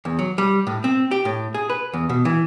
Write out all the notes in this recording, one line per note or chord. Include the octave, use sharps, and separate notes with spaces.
E2
F#3
G3
A2
C4
G4
A2
G#4
B4
E2
B2
E3